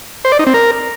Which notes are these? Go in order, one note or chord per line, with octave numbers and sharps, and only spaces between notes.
C5
D5
D#4
C4
A#4